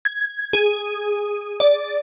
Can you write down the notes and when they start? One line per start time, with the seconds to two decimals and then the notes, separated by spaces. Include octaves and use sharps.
0.05 G#6
0.53 G#4
1.60 D5